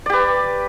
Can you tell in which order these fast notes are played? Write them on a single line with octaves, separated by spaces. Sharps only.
D5 G4 B4